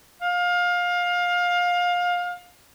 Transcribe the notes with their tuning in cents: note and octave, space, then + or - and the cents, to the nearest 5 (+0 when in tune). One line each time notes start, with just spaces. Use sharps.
F5 +25